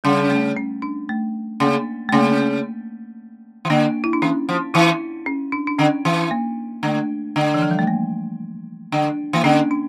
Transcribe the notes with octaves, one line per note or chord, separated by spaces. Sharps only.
C#3 G3
A3
C#4
D4
A3
C#3 A#3
A3
C#3 A#3
E3
D3 A#3
E4
D4
E3 C#4
F3
E3 E4
C#4
D4
D4
D3 C#4
E3
A#3
D3 A3
D3
E3
F3
G3
A3
A#3
D3
E3 A#3
D3 C#4
D4